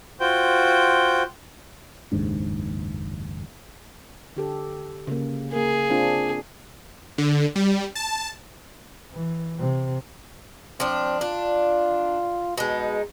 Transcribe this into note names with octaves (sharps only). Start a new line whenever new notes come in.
F4 F#4 C5 G5 G6
F#1 D#2 G#2 D4
D3 G4 A4
C#3 A#3
A#3 G#4 A#4
C4 D4 F4
D3
G3
A5
E3
C3
F3 C4 D4
D4 F4
B2 G#3 D#4